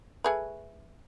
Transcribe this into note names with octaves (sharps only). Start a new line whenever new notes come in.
A3 G#4 B4